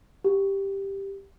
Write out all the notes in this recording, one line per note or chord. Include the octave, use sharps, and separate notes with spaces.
G4